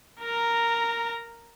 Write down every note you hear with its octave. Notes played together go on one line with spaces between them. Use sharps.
A#4 A#5